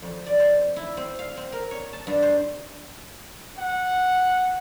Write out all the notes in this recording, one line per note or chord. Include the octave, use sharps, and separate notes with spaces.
F2
D5
C5
E4
C4
F5
C4
A#4
C#5
A5
G2
C5
F#5